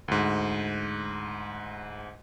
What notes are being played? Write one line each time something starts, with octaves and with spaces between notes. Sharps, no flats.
D2 G#2